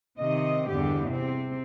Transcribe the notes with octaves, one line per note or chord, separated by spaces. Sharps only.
C3 D#3 D#5
E2 G2 D3 G4
C3 C4